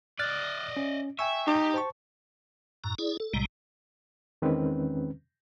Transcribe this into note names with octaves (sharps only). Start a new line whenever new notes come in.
D5 D#5 F6 F#6 A6
C#4
E5 G5 G#5 C#6
D#4 G4
C5 A5 C#6
F#2 A2 A#5
E4 G#4 D5
A4
B1 A2 C3 G3 G#3 A#5
E2 D#3 G#3 C4 C#4 B4